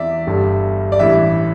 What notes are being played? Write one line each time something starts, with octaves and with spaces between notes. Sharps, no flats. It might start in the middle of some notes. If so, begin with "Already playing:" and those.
Already playing: E2 E3 C4 D5 E5
G1 G2 G3
D5
A1 G2 E3 G3 E5